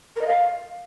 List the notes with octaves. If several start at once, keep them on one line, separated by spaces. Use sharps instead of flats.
A#4
D#5
F5